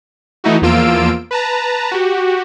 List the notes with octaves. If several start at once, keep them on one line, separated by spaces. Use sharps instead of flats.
E3 A3 D#4 E4 F#4
E2 F3 A#3 F4 E6 D7
B4 A5 A#5
F#4 G4